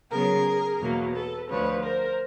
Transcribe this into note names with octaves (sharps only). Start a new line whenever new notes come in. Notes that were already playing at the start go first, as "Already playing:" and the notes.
C#3 F#3 B3 G#4 A#4
E2 B2 F#3 A#3
A4 B4
D2 D3 F3 B4 C#5
A#4 C5